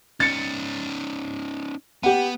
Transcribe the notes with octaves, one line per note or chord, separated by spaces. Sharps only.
C#4 D#4 A6 C#7
B3 G4 F#5